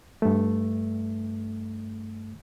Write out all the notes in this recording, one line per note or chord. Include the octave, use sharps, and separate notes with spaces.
G2 A3